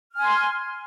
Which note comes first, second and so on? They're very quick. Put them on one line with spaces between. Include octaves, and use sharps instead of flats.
F6 G#5 C6